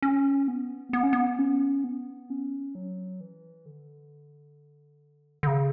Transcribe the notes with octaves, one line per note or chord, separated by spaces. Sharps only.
C#4
B3
B3
C#4
B3
C#4
B3
C#4
F#3
E3
D3
D3
C#3